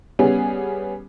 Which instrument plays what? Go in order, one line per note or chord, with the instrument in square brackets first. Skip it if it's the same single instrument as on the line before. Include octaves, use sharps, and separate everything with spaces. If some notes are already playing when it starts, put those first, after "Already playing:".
[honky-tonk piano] G3 B3 C#4 G#4